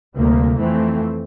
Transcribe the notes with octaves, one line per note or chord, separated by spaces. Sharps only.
D2 C3 G3 A#3
F2 E3 A3 C4